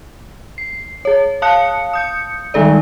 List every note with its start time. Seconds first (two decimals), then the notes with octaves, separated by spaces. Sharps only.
0.58 C7
1.05 G#4 C#5
1.42 F5 A5 D#6 F#6 C#7
1.93 D#6 G6 C#7
2.54 D#3 G3 G#3 D#4 A4 D5